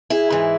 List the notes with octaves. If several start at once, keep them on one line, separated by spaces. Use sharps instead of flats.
E4 G#4
G#2 E3